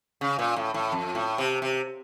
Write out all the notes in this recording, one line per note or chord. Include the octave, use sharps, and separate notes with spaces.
C#3
A#2
A2
A2
F2
A2
C3
C3